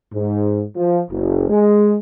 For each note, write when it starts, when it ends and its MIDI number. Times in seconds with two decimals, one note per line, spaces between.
0.13 0.62 44
0.76 0.99 53
1.10 1.46 30
1.49 1.96 56